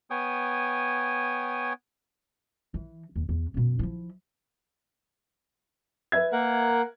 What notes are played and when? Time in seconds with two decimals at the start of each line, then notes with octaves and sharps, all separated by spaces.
0.10 B3 C#5 G5 G#5 D#6
2.74 E3
3.16 D#2
3.29 E2
3.54 F#2 B2
3.79 F3 E4
6.12 B4 E5 G#6
6.32 A#3 A#4 F#5